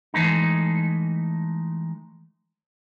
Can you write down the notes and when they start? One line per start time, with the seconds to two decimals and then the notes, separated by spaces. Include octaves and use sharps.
0.14 E3 G#3 A3 D#4